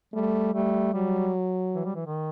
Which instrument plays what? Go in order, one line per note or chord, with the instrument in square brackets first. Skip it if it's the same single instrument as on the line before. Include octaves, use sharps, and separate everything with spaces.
[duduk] G3 [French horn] A3
[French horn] G3 [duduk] A3
[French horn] F#3 [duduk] G3
[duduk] E3
G3
E3
D#3